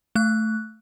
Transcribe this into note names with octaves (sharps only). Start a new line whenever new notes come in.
A3 F#6